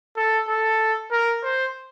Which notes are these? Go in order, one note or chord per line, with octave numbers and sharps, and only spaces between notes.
A4
A4
A#4
C5